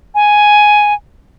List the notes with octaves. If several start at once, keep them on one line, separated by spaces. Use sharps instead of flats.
G#5